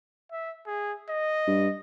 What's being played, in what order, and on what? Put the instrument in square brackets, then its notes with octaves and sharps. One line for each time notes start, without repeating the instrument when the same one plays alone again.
[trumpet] E5
G#4
D#5
[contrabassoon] G2